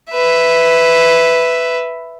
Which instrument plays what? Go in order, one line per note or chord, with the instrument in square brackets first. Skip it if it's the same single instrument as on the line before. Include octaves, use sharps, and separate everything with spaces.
[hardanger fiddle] B4 E5